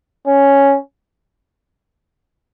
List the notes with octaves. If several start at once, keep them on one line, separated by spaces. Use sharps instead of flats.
C#4